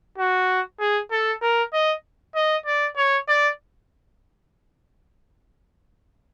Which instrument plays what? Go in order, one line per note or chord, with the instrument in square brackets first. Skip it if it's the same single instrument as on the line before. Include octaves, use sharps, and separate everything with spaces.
[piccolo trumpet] F#4
G#4
A4
A#4
D#5
D#5
D5
C#5
D5